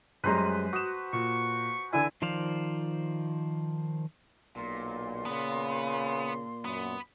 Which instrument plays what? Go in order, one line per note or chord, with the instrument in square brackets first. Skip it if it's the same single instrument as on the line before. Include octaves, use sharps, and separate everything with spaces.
[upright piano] F#2 G3 G#3 [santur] B4 C5 A#5
[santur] F#4 [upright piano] D#6 E7
[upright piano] A#2 [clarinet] C#6
[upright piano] D3 E3 D5 [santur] E4 E6 [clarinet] G#5
[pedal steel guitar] D#3 F3 C5 D5 F5
[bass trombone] B1 [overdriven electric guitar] A#2 [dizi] C6
[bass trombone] C#3 [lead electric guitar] B3
[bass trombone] F#2 [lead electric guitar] B3